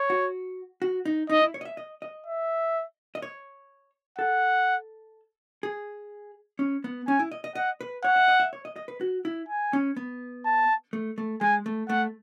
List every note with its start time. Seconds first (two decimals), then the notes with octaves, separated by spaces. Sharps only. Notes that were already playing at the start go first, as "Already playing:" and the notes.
Already playing: C#5
0.10 F#4
0.82 F#4
1.05 D#4
1.30 D#4 D#5
1.41 E4
1.54 C#5
1.61 D#5
1.65 E5
1.77 D#5
2.02 D#5
2.26 E5
3.15 D#5
3.22 C#5
4.18 A4 F#5
5.63 G#4
6.59 C#4
6.84 B3
7.08 C#4 G#5
7.19 E4
7.31 D#5
7.44 D#5
7.55 D#5 F#5
7.81 B4
8.04 C#5 F#5
8.16 E5
8.28 D#5
8.40 E5
8.53 C#5
8.65 D#5
8.76 D#5
8.88 B4
9.01 F#4
9.25 E4
9.48 G#5
9.73 C#4
9.96 B3
10.46 A5
10.93 A3
11.18 A3
11.41 G#3 G#5
11.66 A3
11.89 A3 F#5